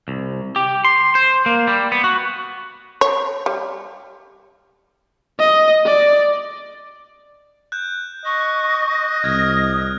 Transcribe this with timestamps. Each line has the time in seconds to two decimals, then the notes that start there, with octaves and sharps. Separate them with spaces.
0.08 C2
0.56 G4
0.85 C6
1.15 C5
1.46 A#3
1.67 G3
1.92 B3
2.04 F#4
3.01 C#5
3.46 G3
5.39 D#5
5.86 D5
7.72 F#6 G6
8.25 D#5 C#6
9.24 C2 D#6 F6 G#6